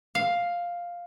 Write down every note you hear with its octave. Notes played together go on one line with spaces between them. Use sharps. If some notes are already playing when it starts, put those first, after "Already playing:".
F5